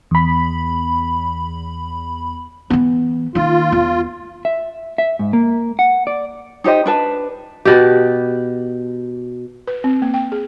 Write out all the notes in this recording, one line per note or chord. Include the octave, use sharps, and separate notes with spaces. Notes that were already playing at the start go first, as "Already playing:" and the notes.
E2 B5
E3 B3
D#3 A#3 F4
E2
E5
E5
G#2
A#3
F#5
D5
D#4 G4 C5 D#5
D4 B4 A5
B2 G4
B4
C4
A#3
G5
G#4